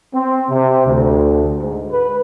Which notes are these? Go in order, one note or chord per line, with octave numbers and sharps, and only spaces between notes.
C4
C3
D2
G#2
B4